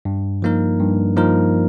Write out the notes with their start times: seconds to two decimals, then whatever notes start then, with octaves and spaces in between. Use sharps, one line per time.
0.05 G2
0.42 F3 A#3 D#4 A#4
0.80 G2
1.17 F3 A#3 D#4 A#4